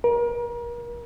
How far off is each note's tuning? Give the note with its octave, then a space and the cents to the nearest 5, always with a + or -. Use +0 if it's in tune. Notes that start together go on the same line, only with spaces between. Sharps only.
A#4 +35